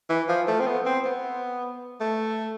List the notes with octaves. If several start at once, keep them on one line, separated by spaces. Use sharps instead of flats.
E3
F3
A3
C4
B3
C4
B3
A3